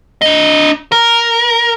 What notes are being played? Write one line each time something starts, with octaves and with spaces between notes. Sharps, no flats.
D4 D#5
A#4